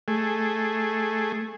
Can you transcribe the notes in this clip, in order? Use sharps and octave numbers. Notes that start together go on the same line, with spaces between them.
A3 G#4